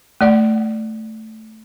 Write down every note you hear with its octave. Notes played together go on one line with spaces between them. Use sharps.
A3 D5 F#5